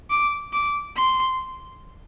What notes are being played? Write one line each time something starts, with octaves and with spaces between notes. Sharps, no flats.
D6
D6
C6